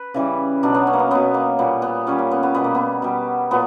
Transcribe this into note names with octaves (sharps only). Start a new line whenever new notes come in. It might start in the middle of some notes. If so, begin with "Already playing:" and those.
Already playing: B4
C#3 E3 G3
B2 F#3 D4
B3
C#4
A#3
B3
B2 F#3 B3
A#3
A#2 G3 B3
B3
A#2 G3 C#4
A#3
B3
B3
B2 G3 B3
A#3
B3
B2 G3
A#2 F#3 B3